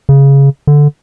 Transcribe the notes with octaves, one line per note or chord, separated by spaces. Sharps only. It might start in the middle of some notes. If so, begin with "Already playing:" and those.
C#3
D3